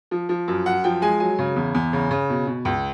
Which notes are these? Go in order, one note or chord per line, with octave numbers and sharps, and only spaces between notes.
F3
F3
F#2
F#2 F#5
F3 G5
G#3 G#5
F#3 G#5
C#3
E2
E2
C#3
C#3
B2
B2
C#2